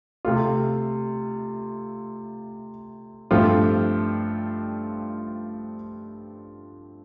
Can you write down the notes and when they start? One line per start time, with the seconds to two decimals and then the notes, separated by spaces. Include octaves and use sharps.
0.25 C3 A3 F4
3.31 G2 F3 A3 C4 F4